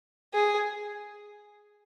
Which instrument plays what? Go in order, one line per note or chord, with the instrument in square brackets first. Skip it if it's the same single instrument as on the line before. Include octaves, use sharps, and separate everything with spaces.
[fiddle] G#4